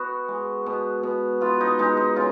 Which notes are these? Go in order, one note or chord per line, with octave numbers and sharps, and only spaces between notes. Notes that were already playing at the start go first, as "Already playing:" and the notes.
Already playing: B3 F#4
G#3
B2
B2
B3 F4
D#4
G#3 D#4
D#4
C#3 F4